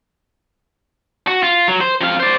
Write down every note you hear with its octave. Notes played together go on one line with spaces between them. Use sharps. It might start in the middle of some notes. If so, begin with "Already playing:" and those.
F#4
F4
F#3
C5
F2 F5
C5 D5